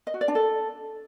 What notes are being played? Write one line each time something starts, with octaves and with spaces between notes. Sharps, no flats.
D#5
F#4
D5
D4
A4